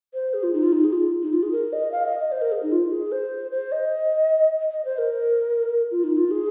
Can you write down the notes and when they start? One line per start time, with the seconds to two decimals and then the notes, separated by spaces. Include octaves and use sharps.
0.14 C5
0.34 G#4
0.43 F4
0.54 D#4
0.63 F4
0.72 D#4
0.84 G#4
0.93 F4
1.22 D#4
1.33 F4
1.43 G#4
1.52 A#4
1.73 D#5
1.92 F5
2.06 D#5
2.19 D#5
2.32 C5
2.42 A#4
2.52 G#4
2.63 D#4
2.72 F4
2.91 G#4
3.12 C5
3.51 C5
3.72 D#5
4.71 D#5
4.85 C5
4.98 A#4
5.91 F4
6.04 D#4
6.17 F4
6.31 G#4